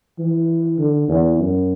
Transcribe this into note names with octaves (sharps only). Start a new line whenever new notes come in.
E3
D3
E2
F#2